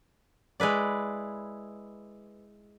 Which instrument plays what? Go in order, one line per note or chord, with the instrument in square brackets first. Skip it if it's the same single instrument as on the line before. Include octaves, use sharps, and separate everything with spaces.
[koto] G#3 E4 B4 D5